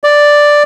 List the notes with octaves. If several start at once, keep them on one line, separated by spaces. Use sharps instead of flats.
D5